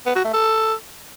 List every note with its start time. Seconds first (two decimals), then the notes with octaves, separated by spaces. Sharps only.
0.06 B3
0.15 F#4
0.24 A3
0.34 A4